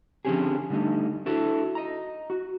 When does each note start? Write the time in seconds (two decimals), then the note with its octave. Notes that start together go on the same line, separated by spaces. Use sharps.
0.25 D3 F3 C4 C#4 G4 G#4
0.70 D3 G3 A3 D#4
1.26 D4 E4 F#4 A4
1.75 D#5 A#5
2.30 F#4